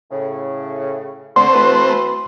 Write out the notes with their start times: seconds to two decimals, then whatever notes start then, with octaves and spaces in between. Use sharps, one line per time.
0.11 A2 C#3
1.36 D3 A3 C4 C5 C6
1.53 E3 F#4 B4